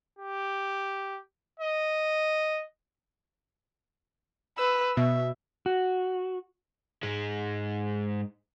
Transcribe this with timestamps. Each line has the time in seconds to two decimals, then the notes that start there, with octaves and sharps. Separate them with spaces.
0.19 G4
1.60 D#5
4.58 B4 E6
4.97 B2 E5
5.66 F#4
7.03 G#2 G#3